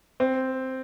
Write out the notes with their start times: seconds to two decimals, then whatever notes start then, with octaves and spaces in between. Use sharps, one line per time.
0.20 C4